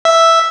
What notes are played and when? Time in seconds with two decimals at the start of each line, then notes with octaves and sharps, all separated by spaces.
0.05 E5